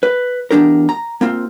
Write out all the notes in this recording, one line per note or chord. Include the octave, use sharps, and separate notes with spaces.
B4
E2 B2 D4 G4 A#4
A#5
A#3 C4 F4